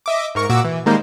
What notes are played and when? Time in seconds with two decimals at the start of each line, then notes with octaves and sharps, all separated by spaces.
0.06 D#5 E5 D6
0.35 G#2 A#4 C#6
0.50 A#2 F#4 D6 E6
0.65 E3
0.86 D#3 G3 G#3 A#3 D#4 C5